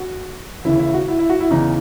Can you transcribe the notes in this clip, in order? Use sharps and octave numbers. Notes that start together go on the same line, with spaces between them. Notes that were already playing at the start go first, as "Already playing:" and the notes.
Already playing: F#4
D#2 C#3 E3 E4
E4
F#4
E4
E4
F#4
E4
E2 C#3 E3 D#4